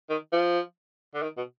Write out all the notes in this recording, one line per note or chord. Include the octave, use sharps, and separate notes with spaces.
D#3
F3
D3
D#3
B2